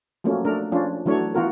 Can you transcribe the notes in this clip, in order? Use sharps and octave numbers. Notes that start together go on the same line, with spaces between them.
F3 F#3 A3 A#3 C#4
A3 D4 A#4
F3 C#4 D4 F4
E3 F#3 A3 D4 C#5
E3 B3 F4 F#4 A#4